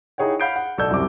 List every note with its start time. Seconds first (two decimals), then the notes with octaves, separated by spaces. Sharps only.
0.18 D#4 E4 G#4 C#5 F#5 G5
0.40 F5 F#5 B5 G6 C7 D7
0.56 F#5
0.78 B1 A4 D5 E6 G6
0.90 C2 F#2 C3 D6